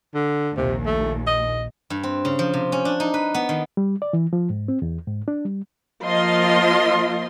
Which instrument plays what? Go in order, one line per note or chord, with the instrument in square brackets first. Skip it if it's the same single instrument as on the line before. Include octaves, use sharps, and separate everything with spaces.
[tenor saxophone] D3
[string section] A#1 D#2 [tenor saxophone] C3
[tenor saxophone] A3
D#5
[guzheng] G2
C4
C#3
F3
C3
C#4
D4
D#4
B4
B3
D#3
[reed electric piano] G3
D5
E3
F3
G#2
C4
E2
G#2
D4
G3
[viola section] F3 A#3 F4 D#5 C6